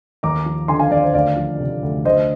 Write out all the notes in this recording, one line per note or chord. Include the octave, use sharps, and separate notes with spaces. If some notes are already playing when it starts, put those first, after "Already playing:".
D#2 A#5 D6
F3
D3 G#5 C6
F5 G#5
D#2 D5 F5
C5
D2 D5 F5
F3
C3
D2
D2 C5 D#5